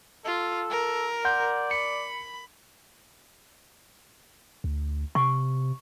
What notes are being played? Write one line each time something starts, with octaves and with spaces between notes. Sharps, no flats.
F4 A4
A#4
D5 F#5 C6 G6
B5 C#7
D2
C3 C#6